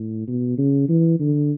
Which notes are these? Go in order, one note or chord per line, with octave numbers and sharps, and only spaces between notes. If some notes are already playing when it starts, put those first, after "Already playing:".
Already playing: A2
B2
C#3
E3
D3